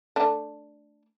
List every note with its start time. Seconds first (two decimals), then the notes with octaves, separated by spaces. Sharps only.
0.16 A3 D4